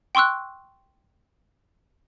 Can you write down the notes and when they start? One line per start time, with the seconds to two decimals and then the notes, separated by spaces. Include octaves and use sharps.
0.15 G5 C6 C#6 E6 F#6